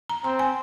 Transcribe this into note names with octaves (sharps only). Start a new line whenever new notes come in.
A#5
C4 A#5
G#5